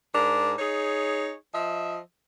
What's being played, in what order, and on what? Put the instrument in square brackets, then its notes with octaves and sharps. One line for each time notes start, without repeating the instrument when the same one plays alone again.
[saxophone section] G#2 D4 A#4
D#4 G#4 C#5
F3 D#5 E5